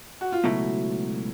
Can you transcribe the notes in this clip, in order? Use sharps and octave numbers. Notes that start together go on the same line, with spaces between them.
F#4
F4
C#2 B2 F#3 A3 E4